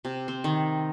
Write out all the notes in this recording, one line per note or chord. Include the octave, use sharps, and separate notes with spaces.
C3
C4
D#3